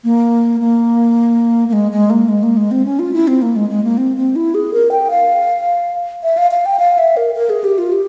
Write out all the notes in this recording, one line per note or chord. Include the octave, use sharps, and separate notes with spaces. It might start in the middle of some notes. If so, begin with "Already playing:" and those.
A#3
A#3
A#3
G#3
G#3
A#3
G#3
A#3
G#3
C4
C#4
F4
E4
C4
A#3
G#3
G#3
A#3
C4
C4
E4
G#4
A#4
G5
F5
E5
F5
F5
G5
F5
E5
A#4
A#4
G#4
G4
F4
G4